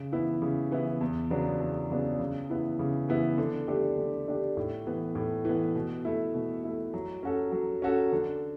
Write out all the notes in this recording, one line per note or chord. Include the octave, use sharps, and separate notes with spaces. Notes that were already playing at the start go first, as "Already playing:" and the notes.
Already playing: C#3
E3 B3 E4
C#3
E3 B3 E4
E2
C#3 F#3 B3 D4
E2
C#3 F#3 B3 D4
C#3
E3 B3 E4
C#3
E3 B3 E4
D3
A3 D4 G4
D3
A3 D4 G4
A2
E3 B3
A2
E3 B3
B2
A3 E4
B2
A3 E4
F#3
C#4 F#4 A4
F#3
C#4 F#4 A4
D3